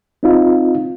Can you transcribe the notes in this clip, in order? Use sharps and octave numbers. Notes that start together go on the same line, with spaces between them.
C4 D#4 F4